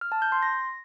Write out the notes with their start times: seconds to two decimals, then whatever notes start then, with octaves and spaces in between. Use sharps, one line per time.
0.01 F6
0.12 A5
0.22 G6
0.32 C6
0.42 A#6